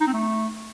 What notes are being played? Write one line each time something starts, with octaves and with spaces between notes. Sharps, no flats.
D#4
C4
A3